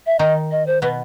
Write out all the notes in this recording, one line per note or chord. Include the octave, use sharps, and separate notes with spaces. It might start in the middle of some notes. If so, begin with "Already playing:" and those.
E5
D#3 D#4 D#5
D#5
C5
B2 B3 B4